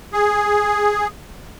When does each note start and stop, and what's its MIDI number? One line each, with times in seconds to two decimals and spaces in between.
0.13 1.07 68